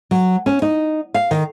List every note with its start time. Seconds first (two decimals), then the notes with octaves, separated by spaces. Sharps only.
0.11 F#3
0.46 C#4
0.62 D#4
1.14 F5
1.31 D#3